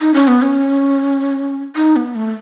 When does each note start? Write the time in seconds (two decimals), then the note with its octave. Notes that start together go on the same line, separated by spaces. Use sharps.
0.01 D#4
0.14 C#4
0.28 B3
0.42 C#4
1.76 D#4
1.96 B3
2.15 A3